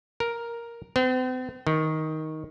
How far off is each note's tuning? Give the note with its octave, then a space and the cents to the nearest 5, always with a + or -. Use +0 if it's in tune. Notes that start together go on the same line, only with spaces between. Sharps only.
A#4 +5
C4 -45
D#3 +10